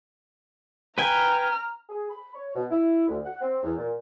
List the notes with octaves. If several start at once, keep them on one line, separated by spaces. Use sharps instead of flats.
B4 G5 G#5 A#5 F6
G#4
B5
C#5
B2
E4
D2
F#5
C4
E2
A#2